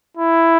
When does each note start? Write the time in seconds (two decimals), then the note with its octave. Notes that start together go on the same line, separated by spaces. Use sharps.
0.17 E4